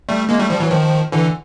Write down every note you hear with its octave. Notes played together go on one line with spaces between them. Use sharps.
G3 A3
G#3 A#3
G3 A3
F3 G3
E3 F#3
D#3 F3
D3 E3